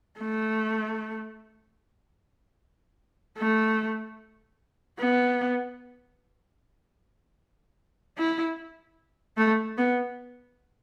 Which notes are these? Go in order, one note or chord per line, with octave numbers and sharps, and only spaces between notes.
A3
A3
B3
E4
A3
B3